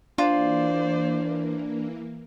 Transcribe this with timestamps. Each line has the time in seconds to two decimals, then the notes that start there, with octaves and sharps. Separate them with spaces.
0.18 E3 A#3 D4 F4 C5 D5